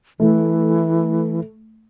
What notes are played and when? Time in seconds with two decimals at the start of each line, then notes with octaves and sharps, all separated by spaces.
0.20 E3 A3